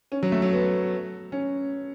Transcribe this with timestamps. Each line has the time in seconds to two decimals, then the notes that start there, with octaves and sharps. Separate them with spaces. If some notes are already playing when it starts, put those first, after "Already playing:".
0.12 C#4
0.23 F#3
0.32 A3
0.42 F#3
0.52 B3
1.32 C#4